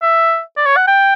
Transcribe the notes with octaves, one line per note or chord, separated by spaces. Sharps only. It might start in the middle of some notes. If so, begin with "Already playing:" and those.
E5
D5
C#5
F#5
G5